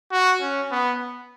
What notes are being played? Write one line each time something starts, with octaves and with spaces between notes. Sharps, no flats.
F#4
C#4
B3